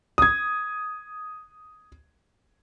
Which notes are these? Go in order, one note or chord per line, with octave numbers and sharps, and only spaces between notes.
D#6 G#6